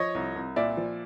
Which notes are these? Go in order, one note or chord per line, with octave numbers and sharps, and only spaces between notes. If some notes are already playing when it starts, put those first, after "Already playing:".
Already playing: F3 C#5 D#5
C2
C2
A#2 D5 E5
F3